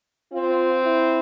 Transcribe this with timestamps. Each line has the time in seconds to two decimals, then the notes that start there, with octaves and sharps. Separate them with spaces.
0.33 C4 F4
0.85 E4